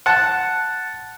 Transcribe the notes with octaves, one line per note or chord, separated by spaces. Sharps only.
F#5 A5